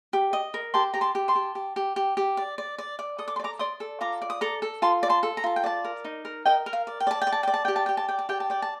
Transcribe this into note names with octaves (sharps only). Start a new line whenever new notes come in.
G4
D#5
A#4
G4 A5 C6
G4 A#5
A5 C6
G4
A5 C6
G4
G4
G4
G4
G4
D5
D5
D5
D5
A4 D#6
D6
C6
D5
A#5 D6
D5 C6 D#6
A4
F4 A#5 D6
D5
D#6
A4 A#5 D6
A4
F4 A5 C6
D5
A5 C6
A4
A#5
F4 A5
G5
D5 F5 A5
A#4
D#4
A#4
A#4 D#5 G5
A#4
F5
D5
G5
D5 A5
G5
D5
A5
D5 G5
A5
G4 G5
A5
G4 G5
A5
D5 G5
A5
G4 G5
A5
D5 G5
A5